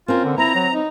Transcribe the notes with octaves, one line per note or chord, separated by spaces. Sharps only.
C4 C#4 F4 A#4
D3
C4 E4 A#5
F#3
D#4